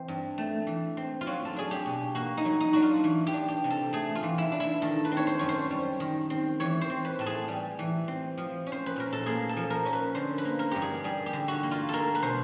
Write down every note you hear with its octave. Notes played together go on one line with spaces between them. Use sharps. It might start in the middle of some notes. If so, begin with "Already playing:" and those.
Already playing: E3 C4
G2
A3
E3
C4
F4
F#3 F#4
A4
D4 G#4
G4
B2
A#3 F#4
D#4
F#3
D#4
D4 F#4
F4
E3
G4
D4
G4
C3
A4
A3 G#4
F4
E3
E4
D4
E4
D#3 A4
B4
C4
C#5
C5
F#2 C#5
C5
G3
D#3
C4
E3 C#5
C5
C4
B4
A2 A4
G#4
G3
E3
C4
F3
C#4
C5
B4
A#2 A#4
A4
A#3 G#4
A4
F3
A#4
C#4
B4
D3 C5
B4
A#3
A#4
G2 G4
G#4
G3 G#4
G4
D3
F#4
A#3
F4
G#3 A4 A#4
B4
B2 C5